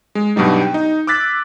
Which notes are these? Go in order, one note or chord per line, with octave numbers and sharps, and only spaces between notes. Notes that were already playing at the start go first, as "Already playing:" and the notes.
G#3
G2 B2 F#3 G3 D#4
G5
D#4
D6 E6 F#6 A6 B6